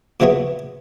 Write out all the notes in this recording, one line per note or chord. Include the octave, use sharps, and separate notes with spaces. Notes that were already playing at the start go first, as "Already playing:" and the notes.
A#2 C#3 E3 F#3 B3 G#4